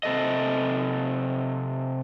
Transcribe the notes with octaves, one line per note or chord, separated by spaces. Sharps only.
C3 A4 D#5